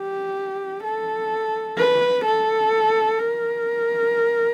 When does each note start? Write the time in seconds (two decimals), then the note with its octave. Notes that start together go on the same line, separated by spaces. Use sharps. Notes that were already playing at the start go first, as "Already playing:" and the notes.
Already playing: G4
0.84 A4
1.77 B4
2.25 A4
3.19 A#4